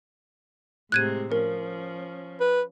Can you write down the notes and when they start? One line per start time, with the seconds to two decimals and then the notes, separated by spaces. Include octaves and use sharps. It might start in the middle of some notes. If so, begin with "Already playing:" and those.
0.92 A2 C3 G#3 F#6 G#6 D#7
1.32 F3 C#4 A#4
2.40 B4